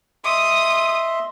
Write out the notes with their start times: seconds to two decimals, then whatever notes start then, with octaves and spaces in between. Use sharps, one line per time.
0.25 D#5 E5 C6 D#6